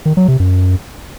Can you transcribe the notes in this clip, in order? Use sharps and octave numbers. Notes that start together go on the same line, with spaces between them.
D#3
F#3
C3
F#2